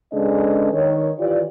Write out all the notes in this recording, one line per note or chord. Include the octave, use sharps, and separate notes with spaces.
C#3 G#3 D4 A4 B4 D#5
D#3 C#5
E3 F4 G4 D5